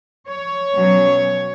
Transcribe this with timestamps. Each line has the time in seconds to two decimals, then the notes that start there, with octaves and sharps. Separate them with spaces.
0.28 C#5
0.75 B2 F#3 C#4